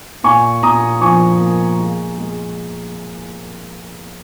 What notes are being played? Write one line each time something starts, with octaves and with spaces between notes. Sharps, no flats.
A#2 G#5 C#6
A#2 A#5 D#6
F3 G#5 C#6
A#3
G#3
G#3